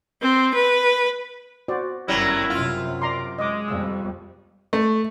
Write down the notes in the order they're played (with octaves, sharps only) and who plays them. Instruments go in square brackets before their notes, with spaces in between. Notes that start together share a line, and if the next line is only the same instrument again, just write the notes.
[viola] C4
B4
[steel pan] F#4 C5 D5
[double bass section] G1 F#2 [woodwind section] D#3 C#4 E4 [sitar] F#3 G3
[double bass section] F#2 C3 [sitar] F4
[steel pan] D5 A#5 C6 [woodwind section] D6
[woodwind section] G#3 [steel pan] D#5 D6
[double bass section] F2 G3 [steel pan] E6
[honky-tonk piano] A3